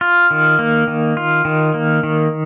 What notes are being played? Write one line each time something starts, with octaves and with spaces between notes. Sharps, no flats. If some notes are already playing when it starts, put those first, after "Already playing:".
F4
D#3
A#3
D#3
F4
D#3
A#3
D#3